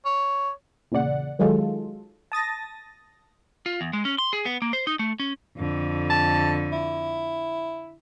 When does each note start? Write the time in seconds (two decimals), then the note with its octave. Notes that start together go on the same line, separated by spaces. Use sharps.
0.06 C#5
0.92 E2 A#2 C#3 D5 F#5
1.39 D#3 F#3 G#3 F4 A4
2.32 A5 D#6 A6 A#6
3.66 F4
3.81 E2
3.93 G#3
4.05 C#4
4.18 C6
4.33 G#4
4.45 B3
4.62 A#3
4.73 C5
4.87 D#4
4.99 A3
5.20 C#4
5.57 F2 D3
6.10 A5
6.72 E4